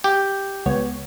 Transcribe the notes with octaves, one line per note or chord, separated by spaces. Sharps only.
G4
C#2 B3 C#5